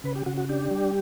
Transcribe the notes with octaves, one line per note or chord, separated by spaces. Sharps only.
C#3 B4
G4
C#3 F#4
F#4
D4 G4
G3